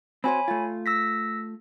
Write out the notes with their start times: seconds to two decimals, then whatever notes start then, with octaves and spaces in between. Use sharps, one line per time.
0.24 C4 F#4 C5 C#5 G#5 B5
0.48 A3 F4
0.86 E6 A#6 B6